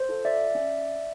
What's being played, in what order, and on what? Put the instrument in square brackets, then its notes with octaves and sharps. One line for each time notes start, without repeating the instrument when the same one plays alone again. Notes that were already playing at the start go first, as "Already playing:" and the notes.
Already playing: [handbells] C5
F4 A4
D5 E5
C#4